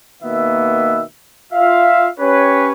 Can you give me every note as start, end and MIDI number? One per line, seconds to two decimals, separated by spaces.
0.23 1.02 47
0.23 1.02 51
0.23 1.02 58
0.23 1.02 59
0.23 1.02 76
1.53 2.09 65
1.53 2.09 76
1.53 2.09 77
2.19 2.72 61
2.19 2.72 67
2.19 2.72 71
2.19 2.72 73